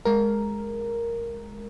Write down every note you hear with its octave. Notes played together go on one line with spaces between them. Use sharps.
G#3 A#4